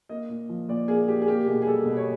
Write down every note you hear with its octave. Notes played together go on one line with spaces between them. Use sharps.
A#3 D#5
A#2
F3
A#2 D5
A#3 G#4
A#2 G4
G#4
A#3 G4
B2 G#4
G#4
G3 A4
B2
C#5